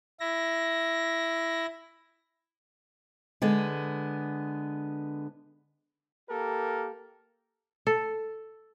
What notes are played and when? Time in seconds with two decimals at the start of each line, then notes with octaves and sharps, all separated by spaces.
0.20 E4 A#6
3.42 D3 G#3 B3
6.30 A#3 G4 A4 A#4
7.87 A4